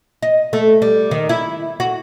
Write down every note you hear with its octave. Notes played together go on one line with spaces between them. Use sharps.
D#5
A3
G3
D#3
E4
F#4